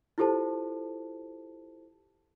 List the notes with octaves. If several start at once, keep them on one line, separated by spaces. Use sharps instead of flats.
E4 F4 G4 A4 C5 A5